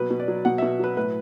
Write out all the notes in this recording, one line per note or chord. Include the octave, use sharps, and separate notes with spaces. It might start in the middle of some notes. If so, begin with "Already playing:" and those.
Already playing: B2 F#3 B4
B2
D5
F#3
B2 F#5
E5
B2
F#3 B4
A2 B4